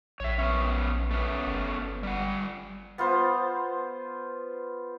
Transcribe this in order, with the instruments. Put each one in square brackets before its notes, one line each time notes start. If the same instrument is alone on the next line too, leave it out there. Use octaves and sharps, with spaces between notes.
[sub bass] A#1 [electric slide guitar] C#5 E5
[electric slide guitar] B3 C#4
A3 B3 C#4
[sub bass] G1
[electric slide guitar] G3 F#5
[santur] B3 F4 B4 C5